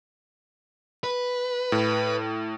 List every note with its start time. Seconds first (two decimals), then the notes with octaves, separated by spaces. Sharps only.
1.04 B4
1.72 A2